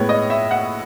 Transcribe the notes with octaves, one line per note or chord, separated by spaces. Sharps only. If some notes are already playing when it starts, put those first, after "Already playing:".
Already playing: A2 G#3 B3 C#5
D#5
E5
F#5